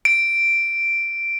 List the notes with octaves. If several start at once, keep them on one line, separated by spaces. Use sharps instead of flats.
D7